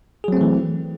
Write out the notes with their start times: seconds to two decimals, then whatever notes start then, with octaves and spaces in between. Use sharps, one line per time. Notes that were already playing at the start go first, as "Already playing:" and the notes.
0.24 G#4
0.28 F#3
0.32 C4
0.37 A3
0.41 E3